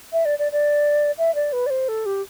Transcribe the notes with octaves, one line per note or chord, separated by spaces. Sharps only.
E5
D5
D5
D5
E5
D5
B4
D5
C5
A4
G4